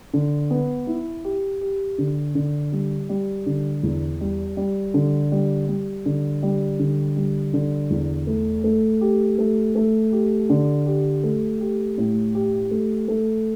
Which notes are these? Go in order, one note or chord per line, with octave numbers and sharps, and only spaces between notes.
D3
B3
E4
G4
G4
D3
D3
G3
G3
D3
E2
G3
G3
D3
G3
G3
D3
G3
D3
G3
D3
E2
A3
A3
G4
A3
A3
G4
D3
G4
A3
G4
A2
G4
A3
A3